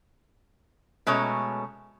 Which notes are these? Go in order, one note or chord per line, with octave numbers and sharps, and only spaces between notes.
B2 G#3 A3 C#4 C#5 A#5